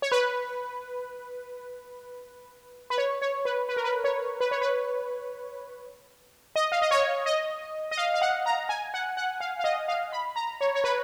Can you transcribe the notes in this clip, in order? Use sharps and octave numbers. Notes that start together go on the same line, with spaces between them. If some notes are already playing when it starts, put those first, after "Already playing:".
C#5
B4
B4
C#5
C#5
B4
B4
A#4
B4
C#5
B4
C#5
B4
D#5
F5
D#5
C#5
D#5
D#5
F5
F5
F#5
A#5
G#5
F#5
F#5
F5
F5
D#5
F5
B5
A#5
C#5
C#5
B4